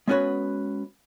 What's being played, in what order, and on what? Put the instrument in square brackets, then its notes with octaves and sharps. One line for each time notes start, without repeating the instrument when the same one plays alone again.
[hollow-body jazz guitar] G#3 B3 C#4 F#4 B4 C#5